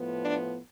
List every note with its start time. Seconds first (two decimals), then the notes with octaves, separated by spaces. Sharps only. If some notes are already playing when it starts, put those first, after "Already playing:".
Already playing: A2 F3 B3
0.25 D4